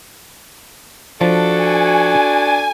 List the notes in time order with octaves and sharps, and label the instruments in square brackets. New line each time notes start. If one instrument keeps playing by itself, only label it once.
[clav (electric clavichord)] F3 A5 [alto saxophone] D4 [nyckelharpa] F#4 A4
[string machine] G#5